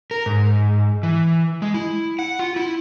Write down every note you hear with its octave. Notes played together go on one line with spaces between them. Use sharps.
A#4
G#2
E3
G#3
E4
F#5
F4
E4